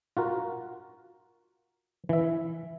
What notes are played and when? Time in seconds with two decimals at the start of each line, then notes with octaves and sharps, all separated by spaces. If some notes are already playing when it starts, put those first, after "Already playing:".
0.17 F4 F#4 A#4
2.09 E3 E5